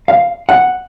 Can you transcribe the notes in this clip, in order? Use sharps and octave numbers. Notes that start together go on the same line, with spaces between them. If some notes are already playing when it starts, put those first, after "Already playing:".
F5
F#5